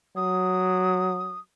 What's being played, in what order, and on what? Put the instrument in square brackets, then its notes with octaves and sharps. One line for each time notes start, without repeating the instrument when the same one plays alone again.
[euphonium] F#3 [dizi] D#6